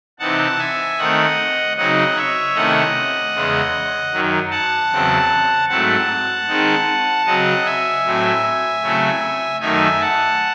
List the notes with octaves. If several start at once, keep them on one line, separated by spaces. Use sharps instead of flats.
C3 E3 C4 D#4 F#5 A5
E5 G#5
D#3 A3 C4 D#4 D#5 F#5
C#3 F#3 C4 D#4 D#5 F#5
C#5 E5
C3 D#3 A3 C#4 E4 D#5 F#5
E2 C#3 G#3
F#2 D#3 F#3
F#5 A5
E2 C#3 F#3 C4
G#2 F#3 A3 C4 E4 F#5 A5
D#3 G#3 C4 D#4
C#3 F#3 C4 D#5 F#5
E5 G#5
A2 F#3 C4 E4
C#3 F#3 A3 C4 E4
F#2 D#3 A3 D#4 E5 G#5
F#5 A5